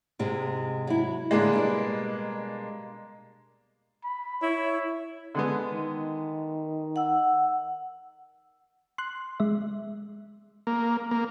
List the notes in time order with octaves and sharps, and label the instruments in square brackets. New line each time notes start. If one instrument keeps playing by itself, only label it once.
[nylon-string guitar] G#2 C3 G#3
F#3 E4
[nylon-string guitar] A2 D3 [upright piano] G#3 A#3 D4
[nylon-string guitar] B2 G3 D5
[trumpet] B5
[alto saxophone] E4 [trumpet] C#5
[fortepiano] D3 G#3 B3
[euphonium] D#3
[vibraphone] F#5 E6
[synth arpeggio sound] C6 F#6
G#3 E5
[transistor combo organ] A#3
A#3